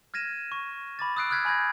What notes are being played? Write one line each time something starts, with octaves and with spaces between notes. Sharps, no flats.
F6 G#6 A#6 D#7 E7
C#6
B5 D6 A6
D#6 E6 F#6 C7 D7
D#6 F6 F#6 G#6 B6 C7
G#5 B5 G6 G#6 A#6